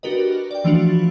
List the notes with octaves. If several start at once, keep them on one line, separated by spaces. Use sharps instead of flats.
D4 F#4 G4 A#4 B4 D#5
D5 G5
E3 F3 A3 D4 F4 F#4